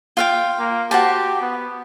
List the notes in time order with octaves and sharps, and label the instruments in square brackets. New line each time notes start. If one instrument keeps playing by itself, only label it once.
[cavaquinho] F4 F5 G5
[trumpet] A#3
[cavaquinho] F#4 C5 A5 [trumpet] G4
[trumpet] B3